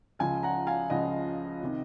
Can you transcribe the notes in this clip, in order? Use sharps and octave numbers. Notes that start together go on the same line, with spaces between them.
C#2 C#3 F3 F5 G#5
F#5 A#5
F5 G#5
C#2 C#3 F3 D#5 F#5
C3 D#3